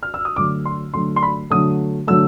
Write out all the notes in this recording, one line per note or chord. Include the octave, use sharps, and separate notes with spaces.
F6
E6
D#6
D3 F#3 A3 D6
C6
D3 F#3 A3 C6
C6
B5
D3 F#3 A3 D#6
D3 F#3 A3 E6